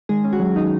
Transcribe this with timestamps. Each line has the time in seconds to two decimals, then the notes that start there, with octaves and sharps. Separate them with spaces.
0.09 D#3 G#3 G#4
0.24 C#4
0.33 F#4
0.40 F#3
0.56 D#3 D#4